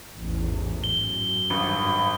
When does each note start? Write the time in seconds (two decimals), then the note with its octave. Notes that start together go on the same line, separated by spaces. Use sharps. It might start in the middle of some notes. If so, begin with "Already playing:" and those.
0.17 A1 E2 G#2
0.84 F#2 G7
1.50 G#1 G2 B5